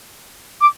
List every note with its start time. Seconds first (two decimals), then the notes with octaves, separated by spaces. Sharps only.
0.61 D6